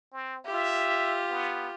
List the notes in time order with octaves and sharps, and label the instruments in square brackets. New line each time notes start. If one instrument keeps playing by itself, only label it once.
[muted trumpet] C4
[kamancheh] F4 G4 [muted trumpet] E5
[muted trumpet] B3